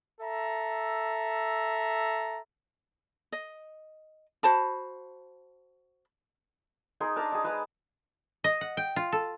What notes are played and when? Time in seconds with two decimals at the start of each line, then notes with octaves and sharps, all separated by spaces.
0.21 A4 E5 A#5
3.32 D#5
4.43 F#4 C5 A5 B5
7.00 D#4 G#4 A#4 C6
7.16 D4 A#4 A5
7.32 D#4 G#4
7.44 G#3 B4 A5 D#6
8.44 D#5
8.61 F#5
8.77 G5
8.96 F4
9.12 A4